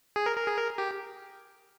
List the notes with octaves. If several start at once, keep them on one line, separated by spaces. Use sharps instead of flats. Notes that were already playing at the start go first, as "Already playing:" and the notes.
G#4
A#4
A#4
G#4
A#4
G4